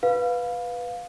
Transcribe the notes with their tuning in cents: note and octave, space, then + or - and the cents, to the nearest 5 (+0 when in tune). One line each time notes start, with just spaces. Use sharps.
B4 +0 F5 +15